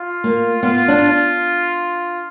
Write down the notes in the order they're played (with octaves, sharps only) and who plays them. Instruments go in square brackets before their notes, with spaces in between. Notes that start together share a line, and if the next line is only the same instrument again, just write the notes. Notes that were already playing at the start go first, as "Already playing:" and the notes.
Already playing: [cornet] F4
[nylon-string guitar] A#3
[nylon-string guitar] B3 [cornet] F4
[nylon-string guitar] D4